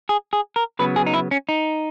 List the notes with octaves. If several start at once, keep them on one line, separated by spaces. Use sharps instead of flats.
G#4
G#4
A#4
C#3 F#3 B3 B4
G#4
D#4
E4
C#4
D#4